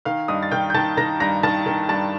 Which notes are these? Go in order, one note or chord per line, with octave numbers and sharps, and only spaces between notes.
D#3 F5 F6
G2 D#5 D#6
A6
D#3 G5 G6
G6
D#3 A5 A6
D#3 A#5 A#6
G2 A#5 A#6
D#3 A5 A6
D#3
G2 A5 A6